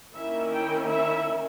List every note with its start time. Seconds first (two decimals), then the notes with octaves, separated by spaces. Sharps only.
0.14 D#3 A#3 C#4 E4 E5
0.52 G5
0.88 E5